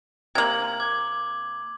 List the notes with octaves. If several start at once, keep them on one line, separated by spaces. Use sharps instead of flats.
C3 A#3 G#6 F#7
D6 G#6